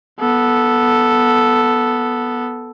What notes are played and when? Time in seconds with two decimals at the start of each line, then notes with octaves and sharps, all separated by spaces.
0.20 B3 A4